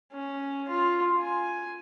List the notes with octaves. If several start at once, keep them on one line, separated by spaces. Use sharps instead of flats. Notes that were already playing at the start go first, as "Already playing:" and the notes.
C#4
F4
G#5